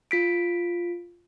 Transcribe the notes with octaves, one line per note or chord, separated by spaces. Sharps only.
F4 B6 D7